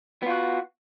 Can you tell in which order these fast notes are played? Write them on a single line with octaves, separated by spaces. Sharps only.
B3 F4 F#4